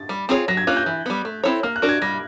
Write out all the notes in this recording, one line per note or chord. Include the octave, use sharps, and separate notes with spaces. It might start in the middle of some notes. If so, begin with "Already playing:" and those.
Already playing: A6
G3
C4 F4 G#4 C#5
F#3 A#6
G#6
A#3 C#4 F4 F#6
G6
E3
G3 B3
A3
C4 E4 A4 C#5
A#3 F6
F#6
D4 F#4 A#4
G#6
G3 A#6